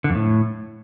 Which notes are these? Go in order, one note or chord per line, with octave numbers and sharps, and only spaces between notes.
D3
F2
A2